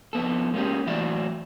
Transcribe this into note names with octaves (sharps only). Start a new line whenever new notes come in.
F2 B3 A4
G#3 A#3 C#4 G4
A2 E3 F#3 D5 E5